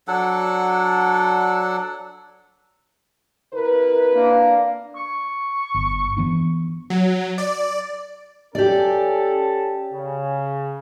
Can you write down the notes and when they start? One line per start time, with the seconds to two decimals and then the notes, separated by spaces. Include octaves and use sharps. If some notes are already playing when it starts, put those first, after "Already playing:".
0.08 F#3 D4 A4 F#5
3.54 C3 E4 A#4 B4
4.14 A#3 D4
4.96 C#6
5.74 G1
6.17 E3 B3 D4
6.90 F#3
7.38 D5
8.55 C#4 G4 A4 D5
9.94 C#3